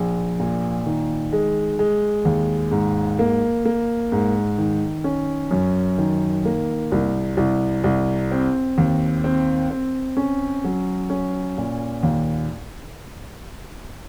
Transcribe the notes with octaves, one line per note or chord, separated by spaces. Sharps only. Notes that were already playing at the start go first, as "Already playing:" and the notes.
Already playing: A#1
A#2
D#3
G#3
G#3
D#2
G#2
A#3
A#3
G#2
D#3
C#4
F#2
D#3
A#3
C2
C2
C2
C4
D#2
C4
C4
C#4
F#3
C#4
A#2
D#2